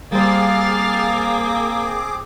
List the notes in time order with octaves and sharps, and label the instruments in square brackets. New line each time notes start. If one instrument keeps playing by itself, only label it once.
[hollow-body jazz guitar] G3 C5 [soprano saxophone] A#3 [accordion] C4 G#4 D6 [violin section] F5 A6